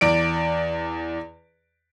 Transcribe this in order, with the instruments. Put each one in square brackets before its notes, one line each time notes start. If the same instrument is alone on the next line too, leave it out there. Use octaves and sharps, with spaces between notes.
[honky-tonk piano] E2 D5 D7